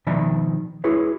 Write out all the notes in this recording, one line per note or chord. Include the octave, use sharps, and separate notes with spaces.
B2 D#3 F3 D5 E5 B5
E4 F#4 G#4 B4 C#5